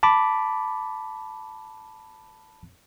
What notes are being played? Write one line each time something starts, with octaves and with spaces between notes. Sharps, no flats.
A5 B5 D6